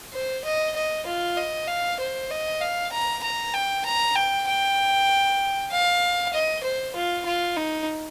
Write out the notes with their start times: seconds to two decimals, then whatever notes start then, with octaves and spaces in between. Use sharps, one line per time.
0.13 C5
0.45 D#5
0.76 D#5
1.07 F4
1.37 D#5
1.68 F5
2.00 C5
2.31 D#5
2.61 F5
2.92 A#5
3.23 A#5
3.54 G5
3.85 A#5
4.16 G5
4.48 G5
5.71 F5
6.34 D#5
6.63 C5
6.95 F4
7.25 F4
7.57 D#4